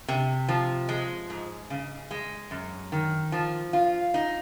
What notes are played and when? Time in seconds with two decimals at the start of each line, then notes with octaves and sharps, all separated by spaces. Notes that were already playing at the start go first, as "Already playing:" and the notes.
0.08 C3
0.48 F3
0.89 G#3
1.30 G#2
1.70 C#3
2.11 G#3
2.51 F#2
2.92 D#3
3.32 F3
3.73 F4
4.14 D#4